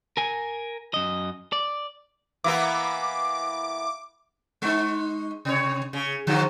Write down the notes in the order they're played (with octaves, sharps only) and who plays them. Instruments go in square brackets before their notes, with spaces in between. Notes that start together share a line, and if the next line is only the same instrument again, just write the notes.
[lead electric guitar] A#4 G#5
F#2 D#5
D5
[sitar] E3 A#3 B3 [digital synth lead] D6
[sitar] G#3 D#4
C3 C#5
C#3
D3 F3 F#3